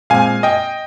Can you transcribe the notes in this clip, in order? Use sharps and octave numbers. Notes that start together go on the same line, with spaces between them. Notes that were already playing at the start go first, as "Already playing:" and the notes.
A#2 G#3 C4 F5 G#5
D#5 G5